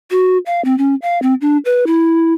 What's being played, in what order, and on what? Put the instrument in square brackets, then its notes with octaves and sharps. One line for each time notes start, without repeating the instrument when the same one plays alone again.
[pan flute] F#4
F5
C4
C#4
F5
C4
D4
B4
E4